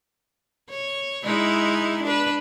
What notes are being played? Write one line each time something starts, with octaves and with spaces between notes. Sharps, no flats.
C#5
G#3 D#4 E4
D4 B4